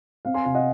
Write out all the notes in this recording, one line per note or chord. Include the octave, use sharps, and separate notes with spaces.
C4 F5
G#5 C6
C3 F5
D#5 F#5